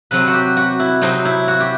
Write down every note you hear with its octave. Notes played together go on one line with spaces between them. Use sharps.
C3 F#3 C4 B4
F#4
G4
F#4
E4
C3 F#3 C4 D#4
E4
F#4
G4